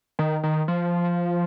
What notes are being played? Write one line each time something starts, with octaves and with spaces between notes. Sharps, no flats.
D#3
D#3
F3